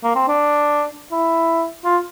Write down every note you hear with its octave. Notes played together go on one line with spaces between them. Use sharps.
A#3
C4
D4
E4
F4